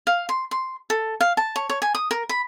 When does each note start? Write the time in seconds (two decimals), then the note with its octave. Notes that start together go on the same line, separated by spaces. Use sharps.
0.07 F5
0.29 C6
0.51 C6
0.90 A4
1.21 F5
1.37 A5
1.56 C#5
1.70 C#5
1.82 G#5
1.95 D#6
2.11 A#4
2.29 B5